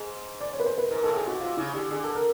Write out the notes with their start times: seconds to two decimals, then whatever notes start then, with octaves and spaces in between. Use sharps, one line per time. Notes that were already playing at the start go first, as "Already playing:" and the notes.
Already playing: G#2
0.41 D5
0.53 C#5
0.60 B4
0.66 C5
0.78 B4
0.91 G#2 A#4
1.03 G#2 A4
1.08 A2
1.16 G#4
1.23 B2 F#4
1.40 C3 F4
1.57 C#3 E4
1.73 D3 G4
1.91 D3 G#4
2.04 A4
2.15 A#4